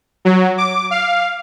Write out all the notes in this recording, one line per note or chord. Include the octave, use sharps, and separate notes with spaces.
F#3
D6
F5